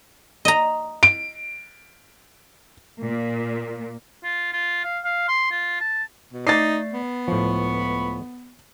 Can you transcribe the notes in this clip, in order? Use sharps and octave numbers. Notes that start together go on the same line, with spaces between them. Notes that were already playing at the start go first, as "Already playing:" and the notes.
D#5 A#5
D7
A#2
F4
F4
F5
F5
C6
F4
A5
B2
A3 D#4 D5 A6 C7
B3
C#2 A2 F3 B5 C#6